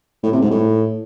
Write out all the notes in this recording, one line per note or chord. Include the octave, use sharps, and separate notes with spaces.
A2
C3
G#2
A2